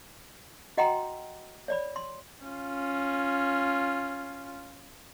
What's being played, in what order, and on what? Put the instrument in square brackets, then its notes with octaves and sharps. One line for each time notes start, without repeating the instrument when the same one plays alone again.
[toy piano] F#4 D#5 F#5 G5 A#5 C6
C#5 D5 B5
C6
[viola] C#4 F4